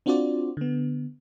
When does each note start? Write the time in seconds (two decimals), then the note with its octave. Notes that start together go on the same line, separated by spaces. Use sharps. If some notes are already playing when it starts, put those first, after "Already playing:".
0.06 C4 D4 F4 F#4 C5 D5
0.57 D3 B3